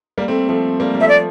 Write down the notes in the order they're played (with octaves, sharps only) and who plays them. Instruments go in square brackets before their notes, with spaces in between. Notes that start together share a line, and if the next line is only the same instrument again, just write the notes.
[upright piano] G3 A#3
A3 C4
F3 A3
G3 A#3
G3
[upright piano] F3 A3 [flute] E5
[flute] D5